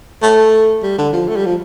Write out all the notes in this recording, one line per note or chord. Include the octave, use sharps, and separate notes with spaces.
A3
G3
D3
F3
A3
G3
F3